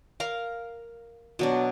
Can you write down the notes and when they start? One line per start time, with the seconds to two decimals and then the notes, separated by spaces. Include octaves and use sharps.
0.20 A#4 F5 A#5
1.39 B2 F#3 D4